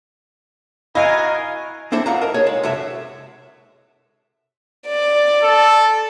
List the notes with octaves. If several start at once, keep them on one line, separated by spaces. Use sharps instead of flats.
E4 F#4 A#4 D#5 F5 G#5
C4 D4 E4 A4 C5
G#2 F4 F5 F#5 A#5
A#4 D#5 A5
D#4 G#4 A4 C#5 D#5
G#3
F#2 C3 A4 E5
D5
A4